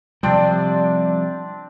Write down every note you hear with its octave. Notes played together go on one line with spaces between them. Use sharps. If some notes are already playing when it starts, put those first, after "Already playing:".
C3 F3 G3 C4 D4 D5